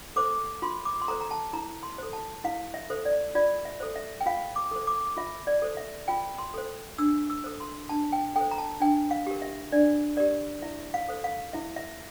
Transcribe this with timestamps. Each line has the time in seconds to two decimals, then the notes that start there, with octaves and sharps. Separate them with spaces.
0.16 A4 C5 D6
0.62 F4 C6
0.85 D6
1.02 C6
1.08 A4 C5 A#5
1.21 A#5
1.31 A5
1.53 E4 A#5
1.83 C6
1.98 A4 C5
2.13 A5
2.44 E4 F5
2.74 E5
2.90 A4 C5
3.05 D5
3.35 F4 D5
3.65 E5
3.80 A4 C5
3.96 E5
4.21 G5
4.26 F4 F5
4.56 D6
4.71 A4 C5
4.87 D6
5.17 F4 E5
5.47 D5
5.62 A4 C5
5.77 E5
6.08 F4 G5
6.39 C6
6.54 A4 C5
6.98 D4 E6
7.30 E6
7.44 A4 C5
7.60 C6
7.89 D4 A5
8.13 G5
8.36 A4 C5 G5
8.51 A#5
8.58 A5
8.80 D4 G5
9.11 F5
9.27 G4 A#4
9.42 E5
9.72 D4 D5
10.17 G4 A#4 D5
10.62 E4 E5
10.94 F5
11.09 A4 C5
11.24 F5
11.53 E4 E5
11.76 E5